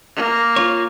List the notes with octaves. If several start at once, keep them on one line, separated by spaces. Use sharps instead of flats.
A#3
F4 C#5